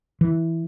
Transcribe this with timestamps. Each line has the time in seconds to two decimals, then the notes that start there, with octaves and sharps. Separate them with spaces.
0.21 E3